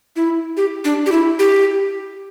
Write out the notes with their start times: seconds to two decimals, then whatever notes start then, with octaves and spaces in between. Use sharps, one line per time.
0.16 E4
0.57 G4
0.85 D4
1.06 G4
1.12 E4
1.39 G4